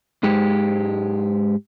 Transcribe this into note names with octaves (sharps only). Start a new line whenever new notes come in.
G#2 G#3 G4